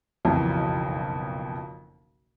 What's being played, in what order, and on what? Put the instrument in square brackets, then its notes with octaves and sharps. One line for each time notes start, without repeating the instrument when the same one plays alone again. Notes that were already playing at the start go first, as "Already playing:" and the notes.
[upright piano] F#1 B1 F2 B2 E3